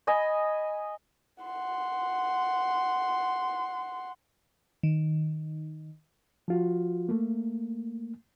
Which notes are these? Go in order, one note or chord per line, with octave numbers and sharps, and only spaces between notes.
D#5 G#5 B5
F#5 C6
D#3
F3 F4 F#4
A3 A#3